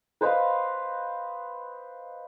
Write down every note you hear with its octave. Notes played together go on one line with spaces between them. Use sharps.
B4 C5 D#5 F5